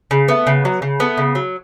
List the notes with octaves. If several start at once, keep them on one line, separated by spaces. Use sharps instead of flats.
C#3
A3 B3
C#3
F#3
C#3
A3 B3
C#3
F#3